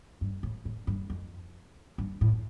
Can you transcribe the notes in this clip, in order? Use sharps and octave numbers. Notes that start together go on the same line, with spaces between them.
G2
A2
A2
G2
F2
G2
A2